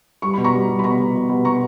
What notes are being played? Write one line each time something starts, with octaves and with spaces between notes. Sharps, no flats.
G3 C#6
B2 B5
A#5 C#6
G3
G3
B5
B2 A#5 C#6
B2
B2
B2
B2 A#5 C#6